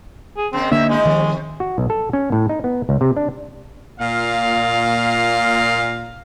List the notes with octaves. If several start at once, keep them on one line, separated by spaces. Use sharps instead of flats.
G#4
C#3 G#3 A#3 C4
D3 A#3 D4 D#4 C#5 E5
D#3 G#3 D#4 E4
C3 D#3 F3
F#4
B1
A4
C#4
A2
D#4
B3
C#2
C3
D4
A#2 F5